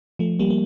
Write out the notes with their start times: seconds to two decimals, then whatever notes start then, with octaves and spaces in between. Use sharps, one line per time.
0.19 F3 A3
0.39 G3 A#3
0.50 A#3